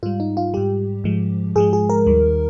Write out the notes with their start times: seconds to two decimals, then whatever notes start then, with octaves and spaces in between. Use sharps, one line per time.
0.03 G#2 G3 F4
0.20 D#4
0.37 F4
0.54 G#2 G3 G4
1.04 G#2 F3 G#3
1.55 G#2 F3 G#3 G#4
1.73 G#4
1.90 A#4
2.07 D#2 D#3 G3